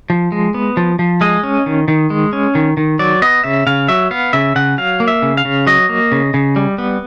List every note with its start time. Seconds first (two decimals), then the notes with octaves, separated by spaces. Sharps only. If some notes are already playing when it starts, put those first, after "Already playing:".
0.10 F3
0.32 G#3
0.54 B3
0.77 F3
0.99 F3
1.21 G#3 D#5
1.43 C#4
1.66 D#3
1.88 D#3
2.10 G#3
2.33 C#4
2.55 D#3
2.77 D#3
2.99 F#3 D5
3.22 B3 D#5
3.44 C#3 E5
3.67 C#3 F5
3.88 F#3 E5
4.11 B3 F5
4.33 C#3 E5
4.56 C#3 F#5
4.78 F#3 F5
5.00 A#3
5.08 E5
5.22 C#3
5.37 F5
5.45 C#3
5.67 F#3 D#5
5.89 A#3
6.12 C#3
6.34 C#3
6.56 G3
6.78 B3